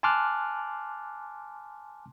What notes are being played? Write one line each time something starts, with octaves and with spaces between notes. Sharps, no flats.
G#5 A5 C6 D6 F6 F#6